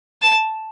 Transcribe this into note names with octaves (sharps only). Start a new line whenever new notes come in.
A5